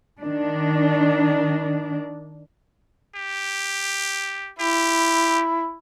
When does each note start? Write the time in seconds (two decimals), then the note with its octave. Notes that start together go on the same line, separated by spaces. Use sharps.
0.22 D#3 D4
3.15 G4
4.60 E4 G4